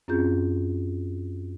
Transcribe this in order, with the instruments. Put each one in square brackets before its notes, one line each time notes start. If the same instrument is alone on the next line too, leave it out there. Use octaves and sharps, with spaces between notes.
[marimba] F#2 C4 C#4 F4 G#4 G6